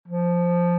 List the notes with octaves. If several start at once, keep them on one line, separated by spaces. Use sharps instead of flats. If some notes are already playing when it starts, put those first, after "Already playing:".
F3